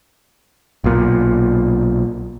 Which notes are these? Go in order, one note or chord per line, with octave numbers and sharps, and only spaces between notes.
B1 A#2